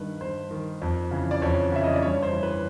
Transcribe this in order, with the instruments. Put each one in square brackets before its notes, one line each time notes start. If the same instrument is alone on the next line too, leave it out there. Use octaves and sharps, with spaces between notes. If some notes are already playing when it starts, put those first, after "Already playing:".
Already playing: [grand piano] G2 D#3 B4
G2 C5
D#3
F2
C#3 E3
D5
F2 C#5
C#3 E3 E5
D#5
D5
G2 C#5
C5
E3
B4